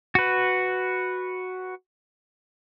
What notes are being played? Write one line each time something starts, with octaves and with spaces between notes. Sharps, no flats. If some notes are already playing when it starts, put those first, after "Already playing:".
F#4 B4